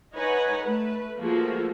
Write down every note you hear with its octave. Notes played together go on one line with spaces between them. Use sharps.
D#4 B4 C#5 F#5 G#5
A3 B4
F3 A3 A#3 F4 F#4 G#4